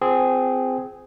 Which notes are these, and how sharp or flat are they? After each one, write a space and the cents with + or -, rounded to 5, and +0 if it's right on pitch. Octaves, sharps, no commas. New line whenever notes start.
C4 -20 F4 +0 G#4 +0